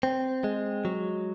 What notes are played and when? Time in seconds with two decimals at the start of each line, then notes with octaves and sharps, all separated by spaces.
0.03 C4
0.44 G#3
0.85 F#3